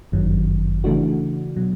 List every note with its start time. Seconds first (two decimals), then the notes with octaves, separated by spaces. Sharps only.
0.12 G1 F#2 D#3 F#3
0.84 C#3 E3 A3 D4 F#4
1.57 B2 F#3